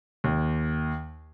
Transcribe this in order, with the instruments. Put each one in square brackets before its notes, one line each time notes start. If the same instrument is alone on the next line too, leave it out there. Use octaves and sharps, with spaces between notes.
[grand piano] D#2